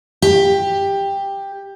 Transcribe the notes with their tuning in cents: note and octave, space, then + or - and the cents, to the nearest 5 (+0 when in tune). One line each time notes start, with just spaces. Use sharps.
G4 +10